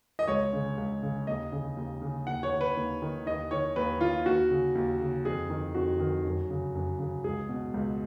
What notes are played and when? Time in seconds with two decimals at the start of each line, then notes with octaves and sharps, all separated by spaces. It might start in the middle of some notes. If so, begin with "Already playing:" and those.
0.19 D#5
0.28 C#2 C#5
0.53 C#3
0.78 C#2
1.03 C#3
1.27 D#2 D#5
1.52 C#3
1.77 D#2
2.01 C#3
2.27 D#2 F#5
2.43 C#5
2.52 D#3
2.61 B4
2.77 D#2
3.02 D#3
3.26 D#2 D#5
3.51 D#3 C#5
3.76 D#2 B4
4.01 D#3 F4
4.26 D#2 F#4
4.51 C#3
4.75 D#2
5.01 C#3
5.25 F2 G#4
5.50 D#3
5.75 F2 F#4
5.99 D#3
6.25 F#2
6.50 C#3
6.75 F#2
6.99 C#3
7.24 C#2 G#4
7.49 B2
7.74 C#2